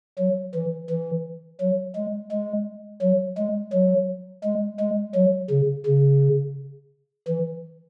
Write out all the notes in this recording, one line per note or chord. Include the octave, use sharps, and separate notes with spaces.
F#3
E3
E3
F#3
G#3
G#3
F#3
G#3
F#3
G#3
G#3
F#3
C#3
C#3
E3